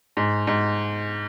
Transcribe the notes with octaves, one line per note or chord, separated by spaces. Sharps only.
G#2
G#2